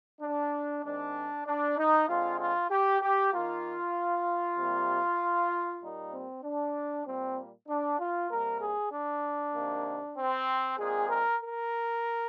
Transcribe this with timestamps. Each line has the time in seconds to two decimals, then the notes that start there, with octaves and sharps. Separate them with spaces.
0.21 D4
0.84 D#3 G#3 C4 D4
1.46 D4
1.78 D#4
2.08 D3 G#3 C4 F4
2.40 F4
2.71 G4
3.01 G4
3.33 D#3 A#3 F4
4.58 C3 G3 A#3
5.81 A#2 G3 A#3 D#4
6.13 C4
6.43 D4
7.06 A#2 G3 A#3 C4
7.68 D4
8.00 F4
8.30 C3 G3 A#3 A#4
8.61 G#4
8.92 D4
9.55 C3 D#3 A#3
10.17 C4
10.78 A#2 G#3 C4 G#4
11.09 A#4
11.41 A#4